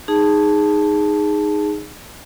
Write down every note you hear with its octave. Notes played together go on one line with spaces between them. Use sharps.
D#4 G#4 A5